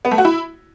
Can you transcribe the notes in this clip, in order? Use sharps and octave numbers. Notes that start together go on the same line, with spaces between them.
B3
A3
F#4
E4